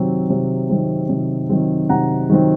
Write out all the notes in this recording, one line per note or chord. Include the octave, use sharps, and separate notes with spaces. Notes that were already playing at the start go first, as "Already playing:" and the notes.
Already playing: C3 D#3 F#3 C4
C3
D#3 F#3 C4
C3
D#3 F#3 C4
C3 F#5 A#5
D#3 F#3 C4